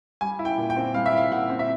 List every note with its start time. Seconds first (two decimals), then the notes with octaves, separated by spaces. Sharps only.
0.21 G3 G#5
0.39 E4
0.45 G5
0.58 A#2
0.70 G5
0.77 C4
0.94 G3 F5
1.06 E5
1.13 E4 F5
1.31 A#2 F#5
1.50 C4
1.59 E5